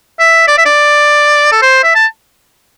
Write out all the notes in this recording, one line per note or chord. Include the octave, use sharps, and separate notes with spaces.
E5
D5
E5
D5
A4
C5
E5
A5